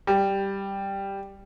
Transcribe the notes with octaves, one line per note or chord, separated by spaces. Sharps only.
G3